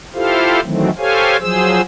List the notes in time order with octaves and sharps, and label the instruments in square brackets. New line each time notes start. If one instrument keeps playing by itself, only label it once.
[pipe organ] E4 F4 G4 A4 C5 F5
D#3 E3 F#3 A3 C4
G4 A4 C5 C#5 F5 G#5
F3 F#3 G#4 C5 E6